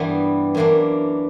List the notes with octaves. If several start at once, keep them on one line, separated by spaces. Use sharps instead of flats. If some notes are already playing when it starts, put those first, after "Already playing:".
Already playing: G2 E3 G3 B3
F#2 E3 A#3 D4